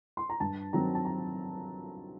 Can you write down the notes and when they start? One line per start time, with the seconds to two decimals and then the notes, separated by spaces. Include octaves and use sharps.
0.17 C6
0.30 A#5
0.40 G2 A5
0.73 D#3 F#3 C4 A#5
0.95 A5
1.05 A#5